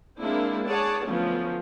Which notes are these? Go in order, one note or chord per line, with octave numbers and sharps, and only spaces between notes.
G#3 A#3 C4 D4 E4
G#4 C#5 D5 F#5 A5
D3 F3 F#3 A3 B3 C#4